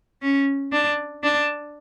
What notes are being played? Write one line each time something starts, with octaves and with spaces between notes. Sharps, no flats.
C#4
D4
D4